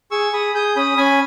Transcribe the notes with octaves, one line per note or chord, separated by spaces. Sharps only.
G#4 C#6 E6
G#4 B5 D#6
G#4 D#6 G6
C#4 B5 D#6
C#4 G#5 B5